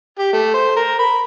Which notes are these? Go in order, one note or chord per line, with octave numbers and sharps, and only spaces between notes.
G4
A3
C5
A#4
B5